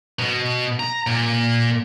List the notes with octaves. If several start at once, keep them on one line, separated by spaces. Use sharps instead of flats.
B2
A#5
A#2